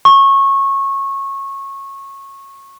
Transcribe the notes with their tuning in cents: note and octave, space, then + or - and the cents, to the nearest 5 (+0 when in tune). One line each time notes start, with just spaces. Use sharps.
C#6 -20